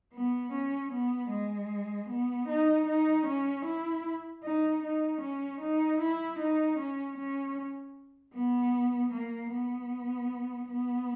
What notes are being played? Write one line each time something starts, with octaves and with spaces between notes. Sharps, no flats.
B3
C#4
B3
G#3
B3
D#4
D#4
C#4
E4
D#4
D#4
C#4
D#4
E4
D#4
C#4
C#4
B3
A#3
B3
B3